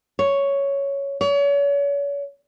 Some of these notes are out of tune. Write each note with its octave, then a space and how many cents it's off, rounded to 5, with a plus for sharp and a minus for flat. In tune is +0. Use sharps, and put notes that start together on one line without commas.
C#5 +5
C#5 +40